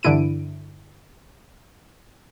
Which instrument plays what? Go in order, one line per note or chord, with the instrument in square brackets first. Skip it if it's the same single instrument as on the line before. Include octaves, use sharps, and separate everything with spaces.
[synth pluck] G2 D3 E3 E4 D7 D#7